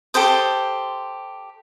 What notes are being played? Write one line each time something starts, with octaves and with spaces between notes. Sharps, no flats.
G4 A4 C5 D#6